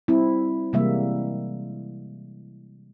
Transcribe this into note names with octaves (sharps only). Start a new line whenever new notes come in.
G3 C4 E4
C3 E3 G3 G#3 A#3 E5